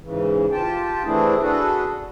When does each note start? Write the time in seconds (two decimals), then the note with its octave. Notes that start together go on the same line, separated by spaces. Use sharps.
0.03 G#2 C#3 E3
0.52 F4 G4 G5 A5
1.05 E3 A3 C4 D4 E4 G#4
1.41 D4 F#4 G#4 A4 B4